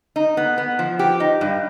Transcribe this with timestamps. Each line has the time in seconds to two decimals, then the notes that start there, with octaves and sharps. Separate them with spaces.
0.16 D#4
0.37 B3
0.58 B3
0.79 F3
0.99 G4
1.20 D#4
1.41 G2